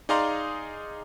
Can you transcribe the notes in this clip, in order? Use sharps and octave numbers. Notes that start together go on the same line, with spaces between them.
D#4 G#4 D5 F5 A#5 C6